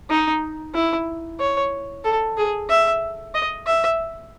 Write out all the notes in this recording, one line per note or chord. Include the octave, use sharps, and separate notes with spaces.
D#4
E4
C#5
A4
G#4
E5
D#5
E5